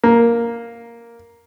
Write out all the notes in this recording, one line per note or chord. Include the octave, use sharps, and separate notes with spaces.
A#3